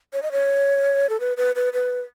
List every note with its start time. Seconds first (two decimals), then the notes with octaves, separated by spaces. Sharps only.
0.13 C#5
0.22 D#5
0.32 C#5
1.09 A4
1.20 B4
1.37 B4
1.56 B4
1.73 B4